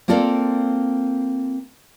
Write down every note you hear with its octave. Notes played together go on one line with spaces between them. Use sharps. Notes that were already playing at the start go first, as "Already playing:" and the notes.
A#3 C4 F4 A4 A#4 D5